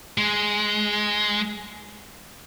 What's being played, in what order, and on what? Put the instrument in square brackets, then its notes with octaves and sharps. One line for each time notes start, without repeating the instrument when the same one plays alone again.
[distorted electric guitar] G#3